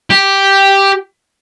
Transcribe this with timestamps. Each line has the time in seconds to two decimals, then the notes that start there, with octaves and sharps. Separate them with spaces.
0.10 G4